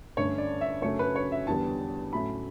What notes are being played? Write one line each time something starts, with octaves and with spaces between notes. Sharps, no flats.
G2 D3 A3 C#4 C#5
D5
E5
F#2 C#3 F#3 A3 C#4 C#5
B4
C#5
E5
E2 D3 G3 B3 A5
A2 F#3 A3 C#4 B5